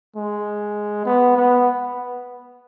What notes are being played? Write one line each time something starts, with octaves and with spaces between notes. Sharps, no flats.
G#3
B3
B3